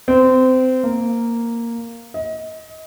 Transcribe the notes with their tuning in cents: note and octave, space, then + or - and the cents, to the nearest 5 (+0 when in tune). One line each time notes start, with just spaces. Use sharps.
C4 -25
A#3 -5
D#5 +30